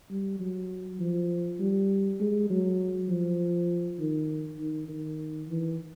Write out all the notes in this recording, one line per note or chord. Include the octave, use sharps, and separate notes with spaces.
G3
F#3
F3
G3
G#3
F#3
F3
D#3
D#3
D#3
E3